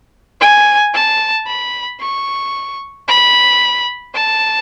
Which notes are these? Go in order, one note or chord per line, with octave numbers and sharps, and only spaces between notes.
G#5
A5
B5
C#6
B5
A5